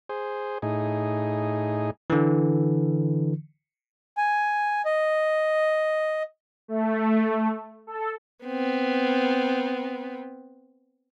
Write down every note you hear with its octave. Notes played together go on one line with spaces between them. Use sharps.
G#4 C5
A2 D#4 G#4
D3 E3
G#5
D#5
A3
A4
B3 C4